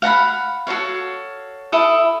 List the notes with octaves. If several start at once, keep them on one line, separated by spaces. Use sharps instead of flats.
F5 F#5 A#5 B5
F#4 A4 C#5 F5
E4 A4 D#6